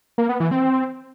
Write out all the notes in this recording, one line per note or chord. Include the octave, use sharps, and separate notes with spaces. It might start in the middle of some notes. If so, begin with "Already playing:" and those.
A#3
B3
E3
C4